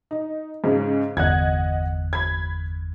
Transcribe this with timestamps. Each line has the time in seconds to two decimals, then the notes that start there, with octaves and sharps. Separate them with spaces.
0.11 D#4
0.64 G#2 C#3
1.17 G1 E2 D#5 F#5 F#6 G#6
2.13 B5 G#6